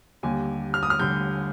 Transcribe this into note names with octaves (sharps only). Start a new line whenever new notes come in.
D#2 D3 G3 G#5
F6
D#6
F6
D3 G3 G6